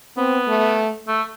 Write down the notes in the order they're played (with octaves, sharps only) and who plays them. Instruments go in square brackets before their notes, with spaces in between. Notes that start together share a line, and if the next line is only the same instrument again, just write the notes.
[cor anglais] B3 [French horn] C4
[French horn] A3
[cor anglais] A3